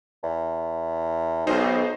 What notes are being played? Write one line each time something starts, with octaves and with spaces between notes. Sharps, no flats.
E2
B1 G#3 D#4 C5 D#5